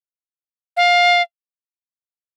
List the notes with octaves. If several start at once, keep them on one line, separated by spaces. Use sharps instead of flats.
F5